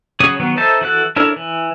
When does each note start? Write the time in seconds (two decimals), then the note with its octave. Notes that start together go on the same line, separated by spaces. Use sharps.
0.20 C#3 F#3 G#4 C#5 D#6
0.40 D#3 F#3 B3
0.57 D#4 A4 C5 E5 A5
0.81 E3 F#4 A4 F#6
1.16 D4 E4 A4 A#4 C#5
1.36 E3